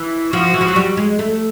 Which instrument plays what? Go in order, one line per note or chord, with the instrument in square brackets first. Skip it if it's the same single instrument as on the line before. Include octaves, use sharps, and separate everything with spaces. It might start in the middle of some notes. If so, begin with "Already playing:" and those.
Already playing: [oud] E3
[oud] F3 [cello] F#4
[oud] E3
F3
F#3
G3
G#3
A3